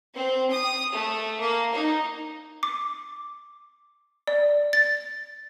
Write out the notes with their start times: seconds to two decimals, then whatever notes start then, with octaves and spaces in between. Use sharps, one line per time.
0.15 C4
0.51 D#6
0.92 A3
1.40 A#3
1.74 D#4
2.63 D6
4.27 D5
4.73 A6